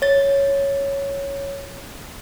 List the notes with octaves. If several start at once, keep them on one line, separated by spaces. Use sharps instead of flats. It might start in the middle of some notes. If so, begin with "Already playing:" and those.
C#5 A6